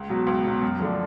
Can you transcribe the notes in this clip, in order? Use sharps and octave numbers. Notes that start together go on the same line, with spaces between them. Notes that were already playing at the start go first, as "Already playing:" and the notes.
Already playing: C#2
B2 F#3
C#2
B2 F#3
F#2
D3 F3 A3 D4